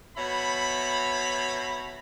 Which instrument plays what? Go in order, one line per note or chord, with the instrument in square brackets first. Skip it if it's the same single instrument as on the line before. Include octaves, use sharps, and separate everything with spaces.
[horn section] B2 C#5 E5 A#5 B5